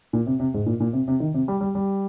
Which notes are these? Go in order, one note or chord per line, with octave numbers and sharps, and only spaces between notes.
A#2
C3
C3
G#2
A#2
A#2
C3
C3
D#3
C3
G3
G3
G3